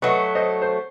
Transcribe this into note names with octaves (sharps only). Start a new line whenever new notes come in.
F#3 A3 B4 D#5
C5 D#5
C5